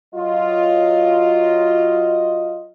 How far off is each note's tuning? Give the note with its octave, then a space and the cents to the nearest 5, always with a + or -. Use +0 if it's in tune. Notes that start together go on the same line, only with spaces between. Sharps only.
F#3 +0 F4 +0 D#5 +0